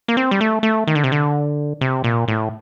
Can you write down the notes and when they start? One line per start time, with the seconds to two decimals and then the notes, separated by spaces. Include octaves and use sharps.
0.08 A#3
0.17 C4
0.31 G3
0.41 A3
0.63 A3
0.87 D#3
0.95 D3
1.04 C3
1.12 D3
1.81 C3
2.04 A#2
2.28 A2